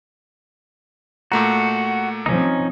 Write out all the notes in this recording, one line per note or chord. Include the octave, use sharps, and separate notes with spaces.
A#2 A3 F#4 A#5
F3 C4 C#4 D#4